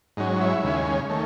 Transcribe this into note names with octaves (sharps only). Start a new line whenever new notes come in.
G#2 F#3 C#4 D#4
E4
D#2 C#3 G#3 C#4
D#3 A3 C#4